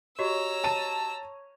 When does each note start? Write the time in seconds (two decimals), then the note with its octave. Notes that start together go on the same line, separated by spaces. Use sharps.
0.19 F#4 G4 C#5 D#5 A#5 E6
0.64 A5 D#7